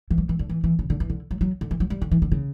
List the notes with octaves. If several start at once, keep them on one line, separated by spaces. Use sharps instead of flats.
E3
F#3
E3
D3
E3
E3
C#3
D3
E3
D3
F#3
F#3
D3
E3
F#3
G3
D3
E3
D3
C#3